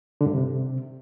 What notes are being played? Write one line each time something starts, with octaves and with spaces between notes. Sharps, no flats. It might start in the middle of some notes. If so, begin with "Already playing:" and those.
D3
G2
C3